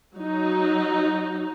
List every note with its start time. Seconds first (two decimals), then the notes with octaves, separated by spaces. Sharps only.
0.15 F#3 D#4